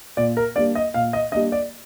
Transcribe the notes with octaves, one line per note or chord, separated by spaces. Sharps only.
A#2 D5
A#4
G3 A#3 D4 D5
D#5
A#2 F5
D#5
G3 A#3 D4 D#5
D5